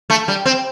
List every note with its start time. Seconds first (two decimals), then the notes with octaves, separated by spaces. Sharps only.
0.10 A3
0.28 G3
0.45 C4